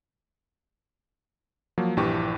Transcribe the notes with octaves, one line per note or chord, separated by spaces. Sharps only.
F3 F#3 A#3
A#1 G2 E3 G4 C#6